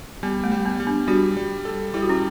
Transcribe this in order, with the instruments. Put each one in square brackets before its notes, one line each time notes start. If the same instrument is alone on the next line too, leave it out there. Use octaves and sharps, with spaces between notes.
[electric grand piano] G3 [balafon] B3
[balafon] A3
[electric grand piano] G3
[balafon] B3
[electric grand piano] G3
[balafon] B3 D4
[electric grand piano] G3 [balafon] D4 F#4
[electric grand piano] G3
A4
[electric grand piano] G3 [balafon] E4
[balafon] F#4
C#4 E4